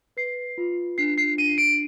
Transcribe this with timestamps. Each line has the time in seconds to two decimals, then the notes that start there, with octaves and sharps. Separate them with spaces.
0.17 B4 C7
0.58 F4
0.98 D4 C7
1.18 C7
1.38 D4 D#7
1.58 D7